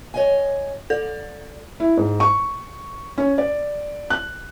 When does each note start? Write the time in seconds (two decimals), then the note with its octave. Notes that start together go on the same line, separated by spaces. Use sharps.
0.14 C#5 D#5 G#5
0.90 A4 D5
1.80 E4
1.97 G#2
2.20 C#6
3.18 C#4
3.38 D5
4.10 F#6